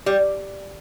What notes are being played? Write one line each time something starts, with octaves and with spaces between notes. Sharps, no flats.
G3